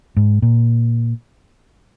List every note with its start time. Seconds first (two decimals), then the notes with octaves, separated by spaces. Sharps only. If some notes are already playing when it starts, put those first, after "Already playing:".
0.17 G#2
0.42 A#2